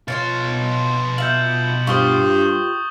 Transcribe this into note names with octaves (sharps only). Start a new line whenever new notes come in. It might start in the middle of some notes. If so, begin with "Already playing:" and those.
B2 F4 C#5 F5 C6 A6
F4 E5 G6 E7 F#7
G2 F4 G4 C5 C#6 D#6 G7